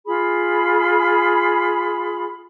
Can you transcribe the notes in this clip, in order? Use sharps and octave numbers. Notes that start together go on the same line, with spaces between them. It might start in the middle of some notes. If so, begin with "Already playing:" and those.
F4 G#4 B5